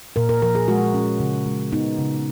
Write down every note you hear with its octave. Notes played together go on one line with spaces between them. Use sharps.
A#2 A#4
A#4
F3 A#4
G#4
G#3 F#4
C#4
C#3
G#3
B3 D#4
C#3